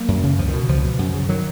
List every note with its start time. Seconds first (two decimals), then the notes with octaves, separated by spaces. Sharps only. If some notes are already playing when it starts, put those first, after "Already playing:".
Already playing: F#3 A#3
0.08 F#2
0.23 C#3
0.38 C#2 F3
0.48 D#3
0.53 B2
0.69 C#2 F3
0.84 B2
0.99 F#2
1.14 C#3
1.29 D#3 F#3